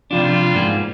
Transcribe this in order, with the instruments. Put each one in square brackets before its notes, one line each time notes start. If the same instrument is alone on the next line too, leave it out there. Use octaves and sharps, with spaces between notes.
[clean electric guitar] C3 F3 D4 [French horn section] G3 F4
[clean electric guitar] G#2 A#3 G#4